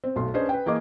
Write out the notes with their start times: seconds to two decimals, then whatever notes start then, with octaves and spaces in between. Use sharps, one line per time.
0.04 C4
0.16 B1 A3 C6
0.34 C#4 D4 G#4 B4 C5 D#5
0.49 B4 G5
0.66 E3 A#3 G#4 D#5 D6